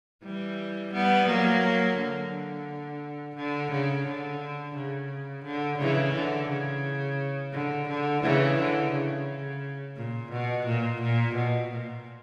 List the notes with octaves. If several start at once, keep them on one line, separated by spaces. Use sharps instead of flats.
E3 G3
G3 B3
F#3 A#3
D3
D3
C#3
D3
C#3
D3
C#3 E3
D3
C#3
D3
D3
C#3 E3
D3
C#3
A#2
B2
A#2
A#2
B2
A#2